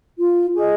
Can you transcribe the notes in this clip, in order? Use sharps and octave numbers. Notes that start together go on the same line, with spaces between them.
F4
G#4 D#5